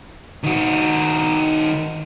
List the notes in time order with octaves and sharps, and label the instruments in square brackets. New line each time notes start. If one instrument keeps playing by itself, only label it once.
[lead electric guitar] D#3 F#4